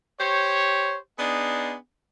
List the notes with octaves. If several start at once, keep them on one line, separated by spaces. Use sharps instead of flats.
G4 C5 C#5
B3 D4 D#4 G#4